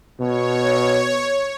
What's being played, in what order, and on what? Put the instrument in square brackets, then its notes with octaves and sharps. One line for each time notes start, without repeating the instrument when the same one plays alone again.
[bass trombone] B2 [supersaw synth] C#5